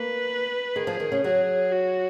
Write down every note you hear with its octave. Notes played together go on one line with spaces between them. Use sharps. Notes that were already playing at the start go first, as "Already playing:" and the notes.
Already playing: A#3 B4
D#3 G#4
F3
D#3
C#3
F#3 G#4
F#4